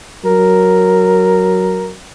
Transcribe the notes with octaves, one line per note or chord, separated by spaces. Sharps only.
F#3 A#4